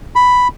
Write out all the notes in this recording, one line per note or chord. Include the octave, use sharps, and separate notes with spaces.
B5